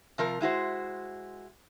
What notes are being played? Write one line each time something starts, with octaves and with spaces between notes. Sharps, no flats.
C3 F3 A#4
G#3 E4 F#4 C5